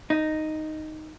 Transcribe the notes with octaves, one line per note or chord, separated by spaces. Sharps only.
D#4